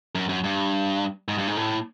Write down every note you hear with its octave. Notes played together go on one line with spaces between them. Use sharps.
F#2
F#2
G2
G#2
G2
G#2
A2